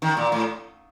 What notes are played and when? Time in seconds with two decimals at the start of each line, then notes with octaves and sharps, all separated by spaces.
0.02 D#3
0.17 A#2
0.32 A2